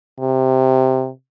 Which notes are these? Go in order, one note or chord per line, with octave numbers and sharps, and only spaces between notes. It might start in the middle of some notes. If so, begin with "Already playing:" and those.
C3